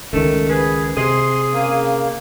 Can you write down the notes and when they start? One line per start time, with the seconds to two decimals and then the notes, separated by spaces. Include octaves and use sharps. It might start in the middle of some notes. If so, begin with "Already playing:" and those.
0.13 C#2 D#3 A3
0.49 G#4 B4
0.97 C3 G#4 C6
1.53 C#3 A#3